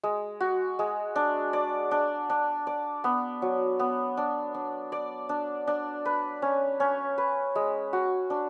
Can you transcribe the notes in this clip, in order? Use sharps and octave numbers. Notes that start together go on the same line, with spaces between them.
G#3
F#4
G#3
D4
D5
D4
D4
D5
B3
F#3
B3
D4
D4
D5
D4
D4
B4
C#4
C#4
B4
G#3
F#4
D4